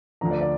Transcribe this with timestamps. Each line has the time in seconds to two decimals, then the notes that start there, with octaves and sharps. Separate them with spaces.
0.21 D2 D3 F3 A#5
0.31 D5
0.41 D5